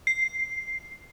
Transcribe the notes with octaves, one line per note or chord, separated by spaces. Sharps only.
C7